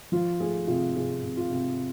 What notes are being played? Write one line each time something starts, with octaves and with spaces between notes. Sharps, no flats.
F3 F4
A3 G#4
C3 F4
C3 G#4
C3
F4
C3